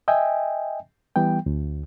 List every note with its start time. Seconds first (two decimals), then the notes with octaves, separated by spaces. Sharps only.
0.08 D#5 E5 G5 G#5
1.16 E3 G3 B3 G5
1.46 D2